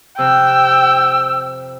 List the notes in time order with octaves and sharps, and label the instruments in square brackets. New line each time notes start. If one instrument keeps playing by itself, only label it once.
[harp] F2 C3 F#6 [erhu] G5 [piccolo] E6